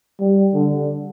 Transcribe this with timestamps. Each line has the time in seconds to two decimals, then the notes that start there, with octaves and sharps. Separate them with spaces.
0.20 G3
0.54 D3